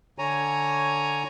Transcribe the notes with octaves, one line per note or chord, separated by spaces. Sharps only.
D3 C#5 G#5 A#5